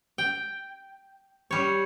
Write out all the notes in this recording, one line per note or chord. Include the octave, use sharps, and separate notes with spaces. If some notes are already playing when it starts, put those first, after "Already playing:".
G5
G3 C#5